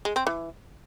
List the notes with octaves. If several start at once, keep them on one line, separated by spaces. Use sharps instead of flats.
G#3
C4
E3